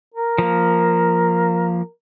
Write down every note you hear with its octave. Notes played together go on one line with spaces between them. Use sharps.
A#4
F3 A#3